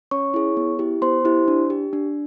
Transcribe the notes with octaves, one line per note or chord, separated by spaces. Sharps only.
C#4 C#5 C#6
E4 G#4
B3
E4 G4
B3 C5 C6
E4 G4
D4
G4
D4